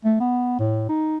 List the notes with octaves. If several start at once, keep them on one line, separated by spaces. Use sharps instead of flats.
A3
B3
A2
D#4